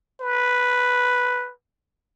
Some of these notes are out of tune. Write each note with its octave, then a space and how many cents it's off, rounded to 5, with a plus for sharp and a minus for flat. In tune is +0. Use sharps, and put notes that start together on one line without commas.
B4 +0